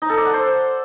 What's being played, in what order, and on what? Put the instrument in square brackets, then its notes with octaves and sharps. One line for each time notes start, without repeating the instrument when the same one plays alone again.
[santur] D#4
A4
D5
F#5
C5